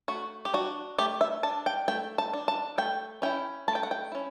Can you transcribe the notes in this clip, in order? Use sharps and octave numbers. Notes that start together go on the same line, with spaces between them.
A3 F#4
G4
D4 F#4
A3 G4
E5
D4 A5
G5
A3 G5
A5
D4
A5
A3 G5
C#4 E4 G5
A3 A5
G5
F#5
G5
C#4 E4